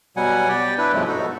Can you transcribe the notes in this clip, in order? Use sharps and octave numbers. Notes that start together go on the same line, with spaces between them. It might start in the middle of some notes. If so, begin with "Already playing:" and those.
B2 F#3 G3 F#5 G#5
G4 D5 G5
D4 E4 B4
G2 B2 F3 F#3 G#3 A3
D#4 F#4 A4